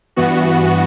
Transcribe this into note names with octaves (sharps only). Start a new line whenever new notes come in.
G2 E3 B3 F#4